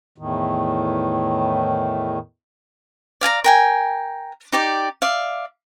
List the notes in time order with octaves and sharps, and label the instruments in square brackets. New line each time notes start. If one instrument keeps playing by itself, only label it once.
[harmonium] E2 A2 D#3
[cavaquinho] D5 F5 G#5 A#5
A#4 G5 G#5
D#4 G4 D5 D6
D5 E5 F5